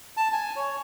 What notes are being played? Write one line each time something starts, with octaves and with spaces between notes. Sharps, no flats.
A5
G#5
C#5